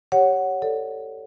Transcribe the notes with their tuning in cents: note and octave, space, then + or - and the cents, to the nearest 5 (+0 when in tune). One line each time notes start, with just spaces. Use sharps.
G4 +0 C#5 +0 F#5 +0
A4 +20 D5 +0